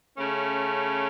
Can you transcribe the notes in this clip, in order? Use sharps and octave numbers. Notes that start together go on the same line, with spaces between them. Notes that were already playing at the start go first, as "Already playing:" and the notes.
C#3 A3 C#4